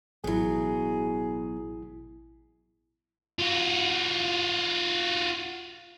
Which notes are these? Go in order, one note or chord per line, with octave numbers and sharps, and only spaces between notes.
A1 B2 F#3 E4 G#4
F4 F#4